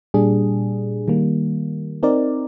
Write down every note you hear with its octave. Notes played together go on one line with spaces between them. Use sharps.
A#2 G3 D4 G#4
D#3 G3 A#3
C4 D#4 A#4 D5